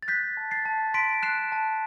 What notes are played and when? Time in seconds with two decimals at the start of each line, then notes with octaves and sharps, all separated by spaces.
0.03 A6
0.08 F#6 G6 B6
0.37 A5
0.51 A6 C7
0.65 A5
0.94 C6 B6 D7
1.23 F#6 C7 E7
1.52 A5